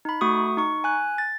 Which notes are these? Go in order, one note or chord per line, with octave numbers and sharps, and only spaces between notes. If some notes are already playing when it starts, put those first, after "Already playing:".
D#4 B5
A3 F#4 C#6 D#6
D#4 C#6
G#5 F#6
A6